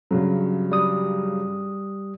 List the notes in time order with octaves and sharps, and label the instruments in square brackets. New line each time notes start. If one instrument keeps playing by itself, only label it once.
[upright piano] G2 C#3 F#3
[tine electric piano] G3 D#6